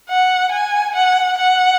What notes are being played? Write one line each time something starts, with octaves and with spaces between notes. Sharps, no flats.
F#5
G#5
F#5
F#5